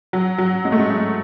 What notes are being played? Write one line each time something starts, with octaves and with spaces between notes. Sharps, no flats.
F#3
F#3
G#3
A3
G#3
G#3